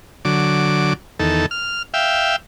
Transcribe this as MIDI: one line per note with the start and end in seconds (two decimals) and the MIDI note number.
0.25 0.93 50
0.25 0.93 54
0.25 0.93 86
1.19 1.46 40
1.19 1.46 51
1.19 1.46 69
1.51 1.83 89
1.94 2.36 76
1.94 2.36 77
1.94 2.36 79